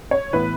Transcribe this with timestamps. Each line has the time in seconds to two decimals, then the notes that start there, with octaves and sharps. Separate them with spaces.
0.11 C#5
0.33 A2 E3 B3 B4